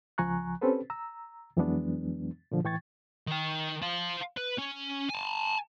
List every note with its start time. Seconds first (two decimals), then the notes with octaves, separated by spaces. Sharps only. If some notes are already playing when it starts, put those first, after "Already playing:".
0.18 C#2 F3 G#5 A#5 C#6 F#6
0.61 C4 C#4 G4 A4 B4 C5
0.90 A#5 E6
1.57 F2 E3 F#3 G#3 B3 D4
2.52 A#2 D3 F3
2.64 A2 E3 G5 C#6 G#6 A6
3.27 D#3 G5
3.82 C5 F5
4.37 B4
4.58 C#4
5.09 G#5 A5